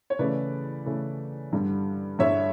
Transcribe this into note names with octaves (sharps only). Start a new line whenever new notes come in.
C#5
C#3 E3 A3 C#4 B4 D5
C#3 E3 A3 C#4
G2 D3 G3
G2 D3 G3 C#5 E5